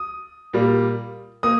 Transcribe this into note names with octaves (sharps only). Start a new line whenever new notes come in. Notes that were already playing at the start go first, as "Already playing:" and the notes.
Already playing: D#6
A#2 G3 A#3
A#3 D#6